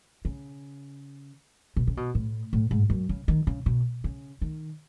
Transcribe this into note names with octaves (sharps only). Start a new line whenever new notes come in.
C#3
B2
C#3
B2
A2
A2
G#2
F#2
C#3
D#3
C#3
B2
C#3
D#3